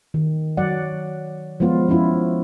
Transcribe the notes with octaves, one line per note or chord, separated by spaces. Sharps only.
D#3
F#3 D5 F#5
F3 G#3 B3 F4
F3 C#4 E4 F4